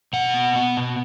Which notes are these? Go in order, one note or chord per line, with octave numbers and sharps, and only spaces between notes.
B2 F#5
B3
B3
B2